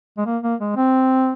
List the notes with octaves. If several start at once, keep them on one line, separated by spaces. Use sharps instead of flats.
G#3
A#3
A#3
G#3
C4